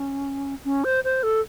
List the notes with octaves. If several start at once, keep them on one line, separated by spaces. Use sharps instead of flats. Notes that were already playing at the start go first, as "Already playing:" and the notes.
Already playing: C#4
C#4
C5
C5
A4